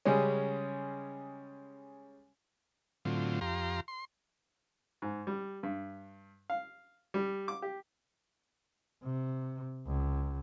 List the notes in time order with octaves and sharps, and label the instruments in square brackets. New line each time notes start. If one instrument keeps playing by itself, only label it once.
[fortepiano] C#3 G3 G#3 C#4
[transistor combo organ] A2 D3 F#3 C4 F4
F2 G4 F5 A#5 C6
C6
[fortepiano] G#2
G3
G2
F5
G3
D6
G4
[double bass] C3
C#2